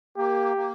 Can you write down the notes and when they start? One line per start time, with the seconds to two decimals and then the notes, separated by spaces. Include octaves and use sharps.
0.18 A#3 G4
0.57 A#3